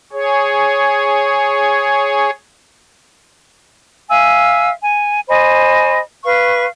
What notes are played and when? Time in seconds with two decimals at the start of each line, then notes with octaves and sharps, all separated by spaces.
0.13 G#4 C#5
4.09 E5 F5 G#5 E6
4.84 G#5
5.28 C5 D#5 G#5 B5
6.24 B4 F5 C#6